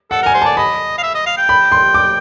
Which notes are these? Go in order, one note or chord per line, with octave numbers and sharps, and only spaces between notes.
A4 F#5
A#4 G#5
C5
A5
D5
D#5 B5
F5
E5
D#5
F5
G5
B5
C6
D6